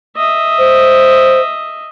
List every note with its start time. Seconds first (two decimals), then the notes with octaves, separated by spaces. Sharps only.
0.17 D#5 E5
0.59 C5